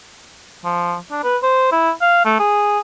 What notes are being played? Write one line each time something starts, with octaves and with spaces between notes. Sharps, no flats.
F3
D4
B4
C5
E4
F5
A3
G#4